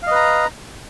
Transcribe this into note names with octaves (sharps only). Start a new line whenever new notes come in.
B4 D#5 F5 A#5